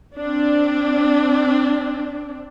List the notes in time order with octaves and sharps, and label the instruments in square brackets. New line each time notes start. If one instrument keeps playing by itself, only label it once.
[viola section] C4 D4